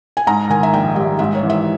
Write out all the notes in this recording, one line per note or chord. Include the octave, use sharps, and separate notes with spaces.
G#5
G#2 A#5
D#3 G#5
E5
A#1 G5
G3 E5
G#2 E5
C#5
E3
E5